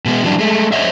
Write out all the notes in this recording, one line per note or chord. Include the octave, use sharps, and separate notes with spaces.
B2 G#3 B3
E3 F#3 G3 D4
G#3 A3
C5 C#5 D#5 E5